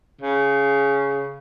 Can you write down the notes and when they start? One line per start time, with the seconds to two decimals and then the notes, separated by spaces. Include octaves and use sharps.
0.21 C#3